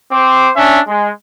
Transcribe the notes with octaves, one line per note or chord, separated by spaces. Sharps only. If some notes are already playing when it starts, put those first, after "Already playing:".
C4 C5 D6
C#4 D4 E5
G#3